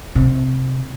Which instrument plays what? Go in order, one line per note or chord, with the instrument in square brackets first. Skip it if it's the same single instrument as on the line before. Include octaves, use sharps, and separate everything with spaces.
[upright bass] C3